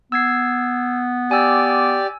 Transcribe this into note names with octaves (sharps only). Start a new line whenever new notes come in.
B3 E6 G#6 C7
G4 D5 G#5 E6